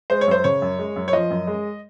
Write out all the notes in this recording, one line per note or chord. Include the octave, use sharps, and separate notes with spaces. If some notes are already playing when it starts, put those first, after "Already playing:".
G#3 C5
C#5
F#2 C5
C#3 C#5
F#2
G#3
F#2
C#5
F3 D#5
F#2
G#3